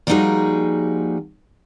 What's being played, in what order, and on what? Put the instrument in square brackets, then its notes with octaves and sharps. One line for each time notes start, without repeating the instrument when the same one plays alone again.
[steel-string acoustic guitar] F3 G3 A#3 D#4 F#4 G#4